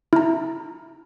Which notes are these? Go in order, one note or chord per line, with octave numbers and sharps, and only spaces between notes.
E4 A#5